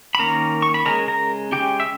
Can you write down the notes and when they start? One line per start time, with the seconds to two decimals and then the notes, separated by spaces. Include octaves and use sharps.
0.15 B5
0.19 D#3 A#3 C#4 A#4 A#5
0.62 C#6
0.74 B5
0.86 C#3 G#3 C#4 A#4 A#5
1.08 A#4 A#5
1.52 C#3 G#3 C#4 G4 G5
1.80 E5